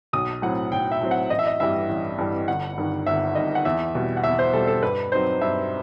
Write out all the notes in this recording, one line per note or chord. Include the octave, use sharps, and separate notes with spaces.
B1 D#6
A2 F#3 C4 F#5
B1 G5
E5
A2 F#3 C4
F#5
A1 D#5
E5
D#5
G2 E3 G3 E5
A1
G2 E3 G3
G1 F#5
G2 D#3
G1 E5
G2 D#3 D#5
F#5
E2 E5
B2 G3
F#5
E2 E5
C5
B2 G3 A4
A4
G2 B4
F#3 C4 D#4 C5
G2 E5